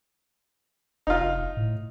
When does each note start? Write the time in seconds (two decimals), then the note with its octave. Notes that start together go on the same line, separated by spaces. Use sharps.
1.07 F1 D#4 F4
1.57 A2